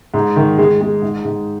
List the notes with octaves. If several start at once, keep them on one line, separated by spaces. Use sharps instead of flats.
G#2
D#3
G#3
G#3
G#2
G#2